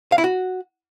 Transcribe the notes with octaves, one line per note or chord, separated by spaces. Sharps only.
F5
E4
F#4